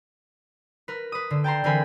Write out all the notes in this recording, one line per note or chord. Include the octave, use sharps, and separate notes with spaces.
A#4 B4
B4 D#6
D3
G5 A5 A#5 C6
D3 E3 C4 A#4 G#5 B5